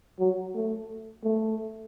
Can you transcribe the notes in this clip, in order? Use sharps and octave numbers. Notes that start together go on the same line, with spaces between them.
F#3
A3
A3